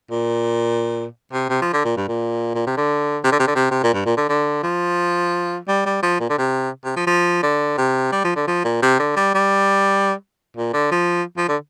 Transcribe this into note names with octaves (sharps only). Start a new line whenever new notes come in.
A#2
C3
C3
F3
D3
A#2
G2
A#2
A#2
C3
D3
C3
D3
C3
D3
C3
C3
A#2
G2
A#2
D3
D3
F3
G3
G3
F3
A#2
D3
C3
C3
F3
F3
D3
C3
G3
F3
D3
F3
A#2
C3
D3
G3
G3
A#2
D3
F3
F3
D3